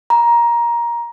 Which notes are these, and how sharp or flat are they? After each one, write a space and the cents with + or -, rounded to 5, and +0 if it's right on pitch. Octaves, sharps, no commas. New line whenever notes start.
A#5 +15